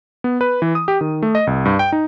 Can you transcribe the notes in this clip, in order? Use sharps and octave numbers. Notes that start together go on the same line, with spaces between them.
B3
B4
E3
D#6
G4
D#3
A3
D#5
C2
G2
G5
D#4